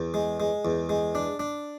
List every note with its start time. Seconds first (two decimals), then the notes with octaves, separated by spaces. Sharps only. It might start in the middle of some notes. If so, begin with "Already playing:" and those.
Already playing: E2
0.14 G#3
0.40 G#3
0.65 E2
0.89 G#3
1.15 D4
1.39 D4